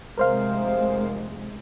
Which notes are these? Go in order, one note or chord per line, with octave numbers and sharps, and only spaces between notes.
F1 C3 G#3 A#4 C5 F5